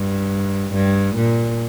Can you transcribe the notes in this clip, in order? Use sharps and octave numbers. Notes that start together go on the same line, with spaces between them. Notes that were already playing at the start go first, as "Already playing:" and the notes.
Already playing: G2
G2
A#2